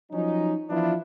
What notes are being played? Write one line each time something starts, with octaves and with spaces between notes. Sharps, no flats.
F3 F#3 C#4 D#4
E3 F3 B3 D4 E4 F4